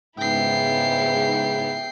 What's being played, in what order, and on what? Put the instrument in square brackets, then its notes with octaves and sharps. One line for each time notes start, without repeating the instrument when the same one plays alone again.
[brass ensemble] G#2 C#3 [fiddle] B3 E4 [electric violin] G5 C7